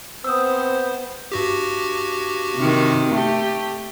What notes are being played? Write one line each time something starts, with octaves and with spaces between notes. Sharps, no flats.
B3 C4 C5 D#6 E6
G2 F#4 G4
C3 D#3
A3 G4